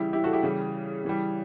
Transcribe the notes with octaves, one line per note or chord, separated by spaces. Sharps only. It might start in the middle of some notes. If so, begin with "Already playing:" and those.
Already playing: C#3 E3 G3 E4 G4
E4 G4
F#4 A4
E4 G4
C#3 E3 G3
C#3 E3 G3